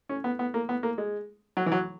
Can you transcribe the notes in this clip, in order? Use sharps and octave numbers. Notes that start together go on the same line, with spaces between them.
C#4
B3
B3
A#3
B3
A#3
G#3
F#3
E3
F#3